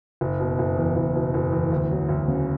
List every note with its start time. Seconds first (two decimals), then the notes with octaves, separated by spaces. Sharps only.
0.21 F#1
0.40 B2
0.59 F#1
0.77 E2
0.96 F#1
1.15 B2
1.34 F#1
1.53 E2
1.72 D2
1.91 F#3
2.09 D2
2.28 C#3